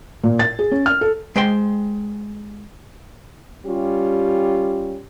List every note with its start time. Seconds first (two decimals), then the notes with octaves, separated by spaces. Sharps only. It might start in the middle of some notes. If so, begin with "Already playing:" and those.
0.23 A#2
0.39 A6
0.59 G#4
0.72 C#4
0.86 F6
1.01 A4
1.36 G#3 C5 G5 C6
3.66 G3 C#4 F4 G4